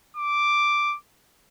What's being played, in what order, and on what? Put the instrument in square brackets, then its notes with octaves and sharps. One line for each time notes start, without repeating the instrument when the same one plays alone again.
[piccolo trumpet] D6